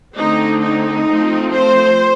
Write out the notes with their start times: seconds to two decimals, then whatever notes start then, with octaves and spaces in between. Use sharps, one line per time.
0.16 D3 A3 C4 D#4
0.62 D#4
1.07 F3 A3 C4
1.53 C5